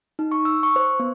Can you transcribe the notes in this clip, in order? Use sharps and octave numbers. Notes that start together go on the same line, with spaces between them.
D#4
C#6
E6
C#6
C5
B3